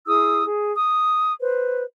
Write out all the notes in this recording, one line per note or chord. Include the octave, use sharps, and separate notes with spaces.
E4 G#4 D#6 E6
G#4
D#6
B4 C5